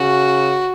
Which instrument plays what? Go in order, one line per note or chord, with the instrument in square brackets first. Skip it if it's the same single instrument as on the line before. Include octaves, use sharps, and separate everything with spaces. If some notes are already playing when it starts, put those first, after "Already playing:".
Already playing: [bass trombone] C#3 [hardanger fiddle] F#4